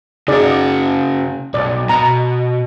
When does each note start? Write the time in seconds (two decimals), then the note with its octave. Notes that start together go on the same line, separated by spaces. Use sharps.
0.28 C#3 D#4 F#4 G#4 D5
1.54 B1 D5
1.89 B2 A#5